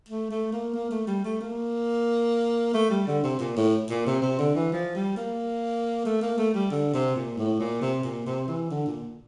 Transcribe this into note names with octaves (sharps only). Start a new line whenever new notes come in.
A3
A3
A#3
A#3
A3
G3
A3
A#3
A3
G3
D3
C3
A#2
A2
A#2
C3
C3
D3
E3
F3
G3
A#3
A3
A#3
A3
G3
D3
C3
A#2
A2
A#2
C3
A#2
C3
E3
D3
A#2